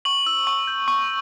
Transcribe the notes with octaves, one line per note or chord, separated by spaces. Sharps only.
C#6 F#7
E6
C#6
G6
C#6